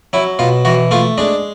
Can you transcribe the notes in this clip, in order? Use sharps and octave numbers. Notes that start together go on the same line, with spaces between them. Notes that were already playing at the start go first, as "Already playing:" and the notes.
F#3 E4
B2 F4
E3 F#4
A3 F4
G#3 D4